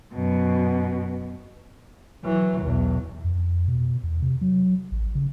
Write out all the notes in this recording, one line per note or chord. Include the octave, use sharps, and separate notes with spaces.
F#2 B2
E3 F#3
B1 E2
F2
B2
E2
C3
F#3
A1
C#3